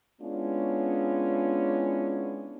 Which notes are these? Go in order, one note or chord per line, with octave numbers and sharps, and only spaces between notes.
G#3 B3 C#4 D4 E4 F4